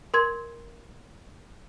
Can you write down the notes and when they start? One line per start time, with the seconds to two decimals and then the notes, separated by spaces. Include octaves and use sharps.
0.14 A#4 C6 G#6